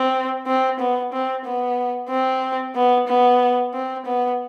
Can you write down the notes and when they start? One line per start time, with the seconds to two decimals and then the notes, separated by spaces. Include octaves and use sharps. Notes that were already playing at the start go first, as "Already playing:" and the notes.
Already playing: C4
0.46 C4
0.80 B3
1.12 C4
1.45 B3
2.09 C4
2.75 B3
3.08 B3
3.74 C4
4.06 B3